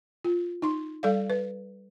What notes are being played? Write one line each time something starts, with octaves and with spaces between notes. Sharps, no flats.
F4
D#4 C6
G3 A4 D5 F5
B4